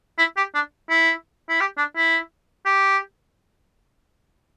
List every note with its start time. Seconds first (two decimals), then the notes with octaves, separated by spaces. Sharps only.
0.18 E4
0.37 G4
0.55 D4
0.90 E4
1.49 E4
1.60 G4
1.78 D4
1.96 E4
2.66 G4